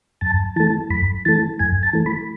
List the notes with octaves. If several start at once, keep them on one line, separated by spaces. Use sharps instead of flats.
F#2 A5
E3 A3 A5
F#2 B5
E3 A3 A5
F#2 G#5
A5
E3 A3
B5